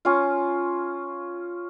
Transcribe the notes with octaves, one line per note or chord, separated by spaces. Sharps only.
C#4 F4